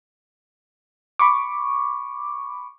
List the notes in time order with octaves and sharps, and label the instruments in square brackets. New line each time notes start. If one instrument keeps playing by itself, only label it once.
[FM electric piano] B5 C#6 D6